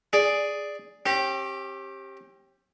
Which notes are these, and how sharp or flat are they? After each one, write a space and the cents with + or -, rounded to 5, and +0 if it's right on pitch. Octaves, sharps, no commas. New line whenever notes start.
G#4 +0 D5 +0
C#4 -45 G4 +0